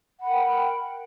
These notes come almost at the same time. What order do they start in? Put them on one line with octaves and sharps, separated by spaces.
F#5 B5 A#4 G5